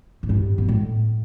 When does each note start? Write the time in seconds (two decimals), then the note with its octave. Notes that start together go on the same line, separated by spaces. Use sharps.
0.23 A2
0.29 G2
0.58 B2
0.68 A2